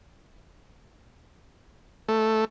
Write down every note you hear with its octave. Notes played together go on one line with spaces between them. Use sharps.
A3